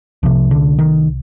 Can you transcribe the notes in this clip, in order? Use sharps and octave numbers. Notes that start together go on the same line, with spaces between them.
C2 C3 F3
D3
D#3